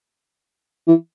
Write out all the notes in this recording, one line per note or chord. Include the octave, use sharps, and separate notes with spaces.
E3